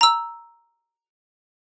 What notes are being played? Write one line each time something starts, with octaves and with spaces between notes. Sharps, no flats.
A#5 E6